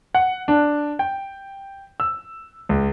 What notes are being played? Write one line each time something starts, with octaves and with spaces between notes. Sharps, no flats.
F#5
D4
G5
E6
C#2